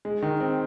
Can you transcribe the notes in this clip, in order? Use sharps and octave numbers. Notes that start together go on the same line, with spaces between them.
G#3
D#3
C4